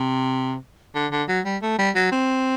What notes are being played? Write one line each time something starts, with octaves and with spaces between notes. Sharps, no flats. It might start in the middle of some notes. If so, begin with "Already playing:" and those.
Already playing: C3
D3
D3
F#3
G3
A3
G3
F#3
C4